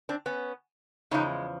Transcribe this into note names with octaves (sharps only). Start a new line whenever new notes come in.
C4 D4
B3 C#4
E2 C#3 F3 G#3 C#4 D#4